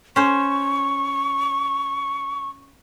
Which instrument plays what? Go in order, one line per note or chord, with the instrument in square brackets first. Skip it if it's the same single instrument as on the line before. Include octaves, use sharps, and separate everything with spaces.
[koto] C#4 C5 [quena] C#6